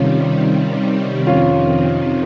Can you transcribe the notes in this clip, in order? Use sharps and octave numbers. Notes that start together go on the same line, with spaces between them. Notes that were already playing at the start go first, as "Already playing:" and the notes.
Already playing: C3 D#3 G3 C#4 F4
F2 C3 D#3 C#4 F4